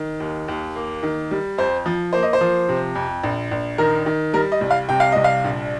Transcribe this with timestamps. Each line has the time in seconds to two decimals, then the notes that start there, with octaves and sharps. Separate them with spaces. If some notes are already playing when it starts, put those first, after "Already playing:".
Already playing: D#3
0.20 D#2
0.48 D#2
0.75 A#3
1.03 D#3
1.31 G3
1.58 F2 C5
1.86 F3
2.13 A#3 C5
2.23 D#5
2.33 C5
2.41 F3
2.69 C3
2.95 F2
3.23 A#1
3.51 A#1
3.78 D#3 A#4
4.06 D#3
4.33 G3 A#4
4.52 D#5
4.61 C2
4.70 F5
4.89 C3 G5
5.00 F5
5.12 C2 D#5
5.24 F5
5.44 A#1